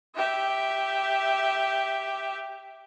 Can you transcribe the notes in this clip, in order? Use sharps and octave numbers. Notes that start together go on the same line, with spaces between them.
G4 E5